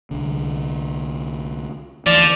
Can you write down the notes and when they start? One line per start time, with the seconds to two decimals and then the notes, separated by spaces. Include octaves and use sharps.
0.11 C2 D3
2.06 D2 E3 F3 D5